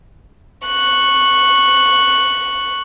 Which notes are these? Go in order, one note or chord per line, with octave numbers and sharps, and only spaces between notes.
C#6 F#6